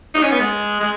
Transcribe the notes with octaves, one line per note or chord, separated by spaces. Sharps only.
D#4
C#4
B3
G#3
G#3